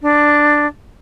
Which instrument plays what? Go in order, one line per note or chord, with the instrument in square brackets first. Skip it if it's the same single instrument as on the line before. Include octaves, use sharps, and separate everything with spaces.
[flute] D4